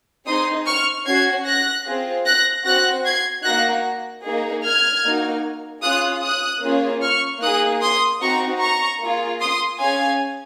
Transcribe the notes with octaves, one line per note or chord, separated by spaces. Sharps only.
C4 D#4 G#4 C6 D#6
C#6 F6
C#4 F#4 G#6 C7
F#6 A#6
C4 F4 G#4
F#6 A#6
C4 F#4 F#6 A#6
G#6 C7
A#3 D#4 F#4 F#6 A#6
A#3 D#4 G#4
F6 G#6
A#3 D#4 F#4
C#4 F4 G#4 D#6 F#6
D#6 F#6
A#3 C#4 F4 G#4
C#6 F6
A#3 D#4 G#4 D#6 F#6
C6 D#6
C4 D#4 F#4 A#5 C#6
A#5 C#6
A#3 F4 G#4
C6 D#6
C#4 G#4 F5 G#5